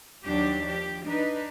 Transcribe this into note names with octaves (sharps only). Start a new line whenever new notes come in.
D#2 F#3 D4 G4
F3 G4
D4 D#4 B4